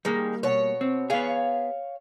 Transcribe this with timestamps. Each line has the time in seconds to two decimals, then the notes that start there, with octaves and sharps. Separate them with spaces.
0.05 D#3 G3 G#3 A#3
0.43 B2 C#5
0.81 C4
1.10 B3 G#4 C#5 F5